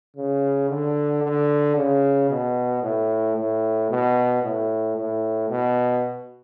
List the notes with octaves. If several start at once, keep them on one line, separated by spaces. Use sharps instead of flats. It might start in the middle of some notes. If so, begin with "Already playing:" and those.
C#3
D3
D3
C#3
B2
A2
A2
B2
A2
A2
B2